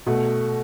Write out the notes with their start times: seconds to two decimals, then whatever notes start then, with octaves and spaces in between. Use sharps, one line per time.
0.06 B2 A3